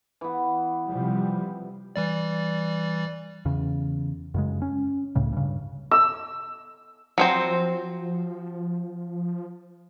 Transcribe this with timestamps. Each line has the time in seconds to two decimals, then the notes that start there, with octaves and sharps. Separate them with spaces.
0.21 E3 B3
0.88 C3 F3 G3
1.96 E3 G3 D5
3.45 E2 C#3
4.34 F#2 C#3 G#3
4.62 C#4
5.15 C#2 A2 C#3
5.33 G2 C#3
5.91 E6
7.18 F3 F#3 C4 C5